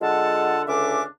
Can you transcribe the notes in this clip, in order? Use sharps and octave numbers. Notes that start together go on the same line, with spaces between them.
D3 G#3 F4 A4 F#5 A5
C#2 D3 C#4 D4 E5 D6